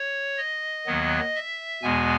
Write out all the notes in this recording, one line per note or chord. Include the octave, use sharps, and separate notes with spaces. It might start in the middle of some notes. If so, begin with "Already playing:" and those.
Already playing: C#5
D#5
D#2 D#3 F#3 B3
E5
E2 B2 G#3 B3 G#5